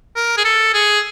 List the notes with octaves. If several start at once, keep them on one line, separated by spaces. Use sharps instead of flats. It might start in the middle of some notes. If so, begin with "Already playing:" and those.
A#4
G#4
A4
G#4